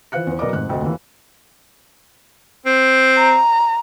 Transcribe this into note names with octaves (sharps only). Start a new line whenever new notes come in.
E3 F4 C5 F5 F#6 C#7
E2 C5
B1 A#4 B4 D5 D#5 D6
F1 G#2 F#6
F1 D2 D#5 G5
D#2 E3
C4
A#5